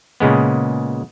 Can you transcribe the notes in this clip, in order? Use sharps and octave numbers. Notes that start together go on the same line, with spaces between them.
A#2 C#3 G#3 B3